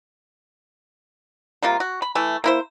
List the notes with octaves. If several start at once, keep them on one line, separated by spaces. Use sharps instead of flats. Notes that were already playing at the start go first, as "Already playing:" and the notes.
C3 G3 A#3 F4
F#4
B5
E3 A3
A#3 E4 C5